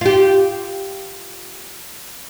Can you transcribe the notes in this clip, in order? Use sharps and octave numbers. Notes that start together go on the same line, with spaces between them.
F4 G4